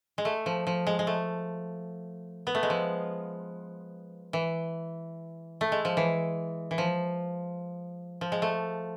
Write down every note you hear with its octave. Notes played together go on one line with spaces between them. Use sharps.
G#3
A3
F3
F3
G#3
G#3
A3
B3
A3
G#3
F3
E3
A3
G#3
F3
E3
E3
F3
F3
G#3
A3